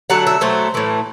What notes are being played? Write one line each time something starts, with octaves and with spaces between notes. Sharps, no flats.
D3 F#3 A3 F#5
E5
B2 F#3 A3 C5
A2 E3 A3